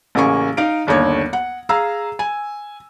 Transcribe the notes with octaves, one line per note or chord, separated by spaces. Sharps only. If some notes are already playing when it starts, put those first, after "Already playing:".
A1 C#3 A#3 G#5 C#6
D#4 F5 D7
G1 D#2 D3 C#5 G#6
F#5
G#4 F5 A#5 E6
G#5